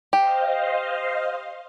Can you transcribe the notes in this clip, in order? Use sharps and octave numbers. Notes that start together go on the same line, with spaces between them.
G4 C5 D#5 F5